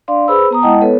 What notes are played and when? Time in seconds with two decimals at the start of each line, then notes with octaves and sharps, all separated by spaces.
0.08 D4 D5 F5 C6
0.28 G#4 B4 C5 B5 E6
0.51 B3 A#5 D#6
0.62 G#3 E4 D#5 F#5 G5 A5
0.81 B3 A4 B4 C#5